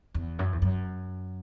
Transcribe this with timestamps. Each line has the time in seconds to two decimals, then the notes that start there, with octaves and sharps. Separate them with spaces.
0.14 E2
0.39 F#2
0.53 E2
0.62 F#2